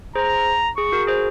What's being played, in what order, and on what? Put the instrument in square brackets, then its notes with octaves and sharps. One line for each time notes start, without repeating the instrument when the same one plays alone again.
[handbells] G#4 C5 [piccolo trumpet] A#5
[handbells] G#4 [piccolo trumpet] C#6
[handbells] F#4 A#4
G#4 C5